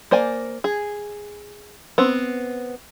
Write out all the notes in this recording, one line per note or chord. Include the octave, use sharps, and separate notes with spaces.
A#3 C5 D5 G#5
G#4
B3 C4